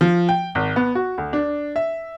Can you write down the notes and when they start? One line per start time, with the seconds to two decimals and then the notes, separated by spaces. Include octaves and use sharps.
0.01 F3
0.29 G5
0.55 G#1
0.76 B3
0.95 F#4
1.18 D2
1.33 D4
1.76 E5